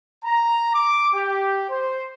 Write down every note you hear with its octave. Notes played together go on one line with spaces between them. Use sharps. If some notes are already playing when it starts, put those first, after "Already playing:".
A#5
D6
G4
C5